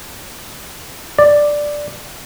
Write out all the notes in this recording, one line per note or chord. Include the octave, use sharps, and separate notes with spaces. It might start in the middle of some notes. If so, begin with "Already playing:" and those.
D5